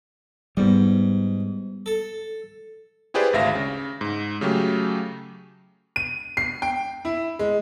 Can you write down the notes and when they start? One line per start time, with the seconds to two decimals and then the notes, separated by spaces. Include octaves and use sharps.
0.57 G#2 G3 B3
1.86 A4
3.14 E4 G4 G#4 B4 C5 D5
3.33 G#1 D2 E5 F5 A#6
3.55 C#3
4.01 G#2
4.41 C#3 F#3 A3 G4
5.96 D#7
6.37 C7
6.62 G5
7.05 E4
7.39 G#3